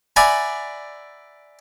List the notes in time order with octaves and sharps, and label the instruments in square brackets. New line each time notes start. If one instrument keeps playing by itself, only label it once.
[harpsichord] D5 E5 F#5 G#5 A#5 B5